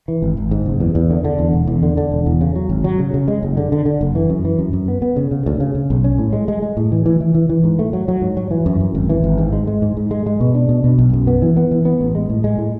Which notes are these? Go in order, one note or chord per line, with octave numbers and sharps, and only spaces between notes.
E3
G#1
G#1
G#2
F#1
E2
E2
D3
D3
E2
E1
E2
D3
D3
E1
E2
C#3
F#3
G#1
F#3
C#3
C#3
G#3
F#1
D3
D3
D3
F#1
E3
F#2
E3
F#2
F#2
B3
B3
C#3
C#3
D2
C#3
C#3
B1
C#4
A2
G#3
G#3
G#3
A2
E3
E3
E3
E3
E3
G#2
A3
F#3
F#3
G#2
F#3
E3
F#2
F#2
G#1
E3
G#1
G#2
G#3
G#3
G#2
G#2
G#3
G#3
B2
D4
B2
B2
B1
F#2
B3
E3
B3
E3
B3
A1
G#3
A2
G#3
A2